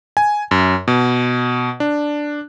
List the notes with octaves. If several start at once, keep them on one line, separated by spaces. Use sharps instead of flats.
G#5
F#2
B2
D4